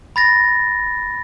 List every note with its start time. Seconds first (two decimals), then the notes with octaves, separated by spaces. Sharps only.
0.16 B5 A6 A#6